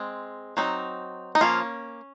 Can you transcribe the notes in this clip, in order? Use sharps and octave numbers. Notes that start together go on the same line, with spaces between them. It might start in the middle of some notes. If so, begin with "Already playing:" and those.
Already playing: G#3 C4
F#3 C4 D#4
D#4
F3 A#3 C#4 F4